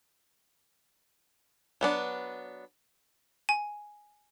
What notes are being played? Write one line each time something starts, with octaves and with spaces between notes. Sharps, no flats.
F#3 B3 D4
G#5